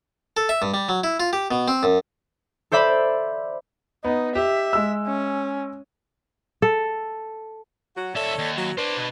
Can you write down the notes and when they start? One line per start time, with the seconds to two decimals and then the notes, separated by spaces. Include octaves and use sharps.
0.37 A4
0.49 E5
0.62 G2
0.74 G3
0.89 F#3
1.04 E4
1.20 F4
1.33 G4
1.51 B2
1.68 C4
1.83 F#2
2.72 A4 C5 D5 E5 B5
4.05 B3 D#4
4.35 G4 E5
4.73 G#3 E6
5.07 C#4
6.62 A4
7.96 F#3 F#4
8.15 D#2 A4 C#5 D5 E5
8.38 D#2
8.57 F#3
8.78 D4 B4 C5 D5
8.97 B2